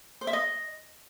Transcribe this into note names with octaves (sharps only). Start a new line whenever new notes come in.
C5
E5
D#5